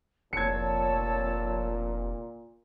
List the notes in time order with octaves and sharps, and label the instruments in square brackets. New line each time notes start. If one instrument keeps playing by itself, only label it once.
[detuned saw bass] F1 [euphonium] A#2 [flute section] C#5 A5 E6 [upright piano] G#6 C#7